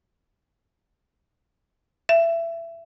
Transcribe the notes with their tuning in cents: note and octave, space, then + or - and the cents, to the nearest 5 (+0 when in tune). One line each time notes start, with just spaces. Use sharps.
E5 +20